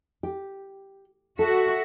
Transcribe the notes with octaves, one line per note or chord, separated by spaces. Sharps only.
G4
F#4 A4 E5